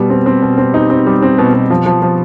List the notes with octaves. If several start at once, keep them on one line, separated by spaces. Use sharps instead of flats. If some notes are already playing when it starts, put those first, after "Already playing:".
Already playing: B2 G3
C4
C4
B2
C4
D#4
C4
G3
C4
B2
B2
F3
F3
F3